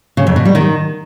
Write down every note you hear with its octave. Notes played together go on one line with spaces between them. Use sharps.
C#3
F2
B2
G3
D#3